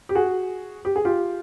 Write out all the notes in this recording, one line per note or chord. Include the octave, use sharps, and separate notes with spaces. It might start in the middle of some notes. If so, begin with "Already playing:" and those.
G4
F#4 G#4
G4
G#4
F4 G4